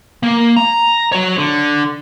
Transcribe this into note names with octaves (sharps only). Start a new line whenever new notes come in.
A#3
A#5
F#4 C#5
D3